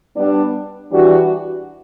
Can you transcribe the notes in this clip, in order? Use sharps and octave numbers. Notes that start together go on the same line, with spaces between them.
G3 B3 D4
E3 G3 D4 F#4